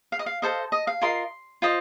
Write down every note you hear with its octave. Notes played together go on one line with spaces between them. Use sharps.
F5
D#5
F5
A4 C5 D#5 F5
D#5
F5
F4 A#4 D#5 C6
F4 C5 D#5